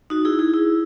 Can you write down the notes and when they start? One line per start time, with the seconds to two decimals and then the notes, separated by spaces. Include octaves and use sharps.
0.10 D#4 F#4
0.25 E4 G#4
0.39 E4 G#4
0.54 E4